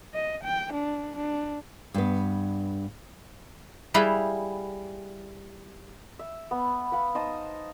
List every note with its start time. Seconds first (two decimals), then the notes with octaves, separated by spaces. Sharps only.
0.14 D#5
0.44 G5
0.73 D4
1.16 D4
1.94 G2 B3
3.94 G3 E4 G#4 B4 E5 F5
6.19 E5
6.51 B3
6.92 B4 F5 F#5 B5
7.15 D#4 C5 A5 D#6